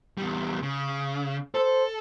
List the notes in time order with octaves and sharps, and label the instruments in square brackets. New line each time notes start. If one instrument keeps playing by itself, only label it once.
[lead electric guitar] E2 G3
C#3
[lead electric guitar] A4 [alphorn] C5